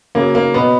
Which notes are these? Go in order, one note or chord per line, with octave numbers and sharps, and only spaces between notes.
C#3 F#3 A#3
A#3
B2 F#3 B3